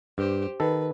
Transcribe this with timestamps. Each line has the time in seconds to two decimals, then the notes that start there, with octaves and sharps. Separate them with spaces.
0.18 G2 G4 C5
0.60 D#3 A4 B4